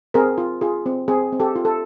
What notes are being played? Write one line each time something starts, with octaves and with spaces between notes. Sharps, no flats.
C4 G#4 A#4
F4
F4 G#4
C4
C4 G#4
C4
G4 A4
F4
A4